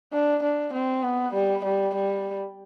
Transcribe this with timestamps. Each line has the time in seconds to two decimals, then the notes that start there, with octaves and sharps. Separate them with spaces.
0.13 D4
0.43 D4
0.73 C4
1.03 B3
1.34 G3
1.64 G3
1.94 G3